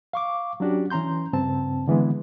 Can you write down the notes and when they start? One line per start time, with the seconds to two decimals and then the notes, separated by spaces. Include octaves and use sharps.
0.13 F5 C#6 D6
0.60 F#3 C#4 D4 F#4 G4
0.90 E3 C#4 A#5 C6 G6
1.33 G2 C#3 C4 A5
1.87 D3 E3 G#3 B3